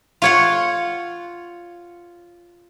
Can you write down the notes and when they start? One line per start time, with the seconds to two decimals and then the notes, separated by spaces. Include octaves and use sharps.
0.22 F4 C#5 F#5